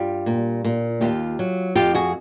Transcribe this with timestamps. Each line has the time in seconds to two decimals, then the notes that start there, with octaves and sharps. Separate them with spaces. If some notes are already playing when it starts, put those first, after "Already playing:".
Already playing: G2 G3 F4 G4
0.26 A#2
0.65 A#2
1.01 D#2 F4 G4
1.39 F#3
1.75 F2 F4 G4
1.94 F#4 G#4